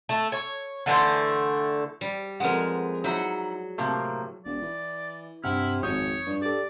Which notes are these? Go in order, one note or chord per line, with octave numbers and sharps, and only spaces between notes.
A3
C#5
D3 E3 A3 C5
G3
F2 G#3 A#4 B4 F#5
F#3 D#4 E4 F#5
A2 C3 A#3
E1 D5
E3
G2 C3 E4 F#5 F6
G#1 F2 C#5 D#6 G6
G2
G4 A4 D5